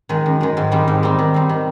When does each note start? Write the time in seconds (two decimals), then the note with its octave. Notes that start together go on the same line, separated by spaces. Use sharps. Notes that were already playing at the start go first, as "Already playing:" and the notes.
0.09 D#3 G#3
0.26 F#2
0.41 D#3 G#3
0.57 G#2
0.71 D#3 G3 C4 D#4
0.88 G#2
1.02 D#3 G3 C4 D#4
1.19 D#3
1.34 G3 C4
1.49 D#3